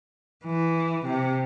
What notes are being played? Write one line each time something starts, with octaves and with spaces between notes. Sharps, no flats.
E3
C3